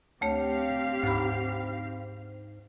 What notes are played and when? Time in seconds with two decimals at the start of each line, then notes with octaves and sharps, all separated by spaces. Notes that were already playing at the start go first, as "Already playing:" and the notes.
0.21 D2 A3 C4 G4 C#5 F5
1.03 D2 G#2 B5